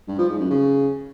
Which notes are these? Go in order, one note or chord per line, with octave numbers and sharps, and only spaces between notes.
G2
F3
G#2
F#2
C#3